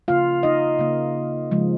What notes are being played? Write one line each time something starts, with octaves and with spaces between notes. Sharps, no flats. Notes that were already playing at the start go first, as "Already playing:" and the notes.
C#3 A#3 F4 F5
D#4 D#5
C#3 A#3
C#3 F3 G#3